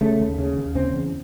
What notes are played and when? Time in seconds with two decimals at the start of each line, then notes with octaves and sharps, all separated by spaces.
0.01 C#3 A3
0.20 D#2
0.38 C#3
0.57 D#2
0.75 C#3 C4
0.94 E2